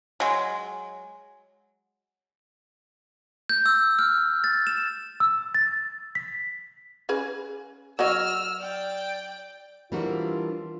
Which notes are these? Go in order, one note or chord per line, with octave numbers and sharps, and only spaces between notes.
F#3 G#3
G6
E6
F6
A6
E7
E6
A6
B6
C#4 G#4 B4
F#3 F#4 D#5 E6 F6
D5 G5
E3 G3 C4 D4 F4 F#4 A#4